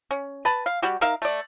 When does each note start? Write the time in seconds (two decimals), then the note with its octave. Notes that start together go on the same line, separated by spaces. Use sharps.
0.11 C#4
0.45 B4 A5
0.66 F5
0.82 G3 F#4 G4
1.01 D#4 A#4 E5 F5
1.22 A3 D5